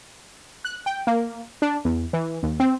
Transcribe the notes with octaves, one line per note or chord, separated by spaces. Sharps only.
F#6
G5
A#3
D4
E2
E3
D#2
C4